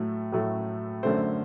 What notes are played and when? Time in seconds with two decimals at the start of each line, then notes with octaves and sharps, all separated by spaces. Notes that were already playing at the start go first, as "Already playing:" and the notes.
Already playing: A2 F#3 A3
0.32 A2 F#3 A3
1.03 F#2 D3 A3 C5